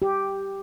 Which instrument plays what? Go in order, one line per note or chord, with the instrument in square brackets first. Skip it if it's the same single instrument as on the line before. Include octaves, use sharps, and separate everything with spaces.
[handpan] G4